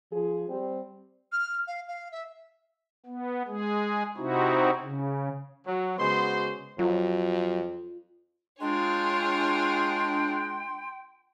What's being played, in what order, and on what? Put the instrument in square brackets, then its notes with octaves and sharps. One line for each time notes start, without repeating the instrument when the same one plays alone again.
[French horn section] F3 G#4
G3 C4
[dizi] F6
F5
F5
E5
[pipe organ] B3
G#3 G#4
C3 C4 D#4 E4 F#4
C#3
[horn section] F#3
C#3 G#3 B3 F#4 C5 C6
[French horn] F2 [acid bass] F#3 [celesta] F4
[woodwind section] G#3 D4 [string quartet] F4 G#4 C#5 [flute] G5 [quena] C6